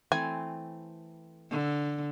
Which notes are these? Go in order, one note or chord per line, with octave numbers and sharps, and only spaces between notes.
E3 A3 C4 G#5
D3